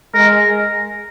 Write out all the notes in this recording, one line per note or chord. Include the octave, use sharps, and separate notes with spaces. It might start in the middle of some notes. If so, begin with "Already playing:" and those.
G#3 A#4